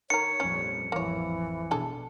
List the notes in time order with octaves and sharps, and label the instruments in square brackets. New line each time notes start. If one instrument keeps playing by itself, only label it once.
[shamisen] D#3 A#4 [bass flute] C#5 [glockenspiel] C#7
[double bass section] A#1 F2 G3 [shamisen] C#4
[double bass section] A1 F2 [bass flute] E3 [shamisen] A#3 C#5
[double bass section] B2 [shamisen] D4 G#4 A4